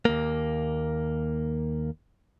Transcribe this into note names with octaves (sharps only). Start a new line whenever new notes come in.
D#2 A#3